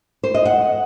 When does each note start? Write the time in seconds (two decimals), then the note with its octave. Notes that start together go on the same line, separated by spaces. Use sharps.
0.24 C5
0.34 D#5
0.45 F#5